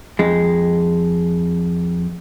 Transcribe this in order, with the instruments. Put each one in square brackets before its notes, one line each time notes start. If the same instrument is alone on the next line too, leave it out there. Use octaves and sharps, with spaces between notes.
[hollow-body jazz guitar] F2 G#3